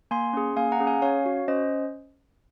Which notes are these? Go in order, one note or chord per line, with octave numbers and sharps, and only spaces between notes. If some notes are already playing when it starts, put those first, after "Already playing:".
A#3 G#5 C6
C#4 G#4
A#3 F5 G#5
F#5 A#5
C#4 G#4
F5 G#5
C#4 C#5 F5
F#4
C#4 C5 D#5